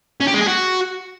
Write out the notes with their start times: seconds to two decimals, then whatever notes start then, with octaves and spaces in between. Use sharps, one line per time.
0.20 C#4
0.27 G4
0.34 G#3
0.41 G#4
0.47 F#4